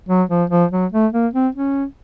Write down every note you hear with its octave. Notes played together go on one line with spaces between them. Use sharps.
F#3
F3
F3
F#3
A3
A#3
C4
C#4